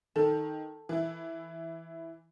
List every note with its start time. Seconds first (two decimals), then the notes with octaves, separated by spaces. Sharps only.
0.16 D#3 A4
0.89 E3 E4